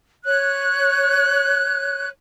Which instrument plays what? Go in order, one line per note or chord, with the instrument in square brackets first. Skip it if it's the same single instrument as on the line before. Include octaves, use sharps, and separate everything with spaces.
[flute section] C#5 F#6